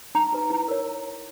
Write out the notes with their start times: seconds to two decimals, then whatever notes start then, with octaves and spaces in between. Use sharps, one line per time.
0.15 D#4 A#5
0.33 F#4 B4
0.50 E4
0.68 A#4 C#5